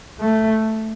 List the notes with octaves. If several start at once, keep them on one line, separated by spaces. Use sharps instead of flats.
A3